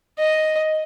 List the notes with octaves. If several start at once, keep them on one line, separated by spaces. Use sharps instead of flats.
D#5